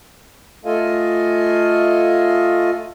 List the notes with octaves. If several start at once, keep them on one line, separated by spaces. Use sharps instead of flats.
A3 F4 A4 D#5 F5 G#5